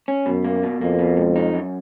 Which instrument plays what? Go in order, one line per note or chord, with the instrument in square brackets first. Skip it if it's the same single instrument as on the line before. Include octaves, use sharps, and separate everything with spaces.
[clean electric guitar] C#4
[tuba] F#2 [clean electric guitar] B2
[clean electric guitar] A#3
B2
[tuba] F2 [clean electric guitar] A#3
[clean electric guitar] B2
C#2
D#4
F#2